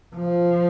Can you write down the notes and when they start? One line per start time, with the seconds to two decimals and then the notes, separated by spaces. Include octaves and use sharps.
0.16 F3